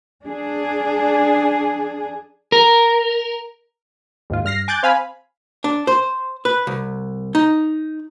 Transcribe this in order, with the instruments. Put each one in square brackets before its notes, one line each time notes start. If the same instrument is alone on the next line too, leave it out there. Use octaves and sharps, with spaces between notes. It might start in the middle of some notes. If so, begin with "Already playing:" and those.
[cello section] D4 G#4
[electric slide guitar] A#4
[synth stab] D#2 G#2 F4
G2 F6 A#6 C7
G#5 D6 F#6 G6 A6
C4 F5 G#5 B5
[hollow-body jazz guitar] D4
C5
B4
C2
D#4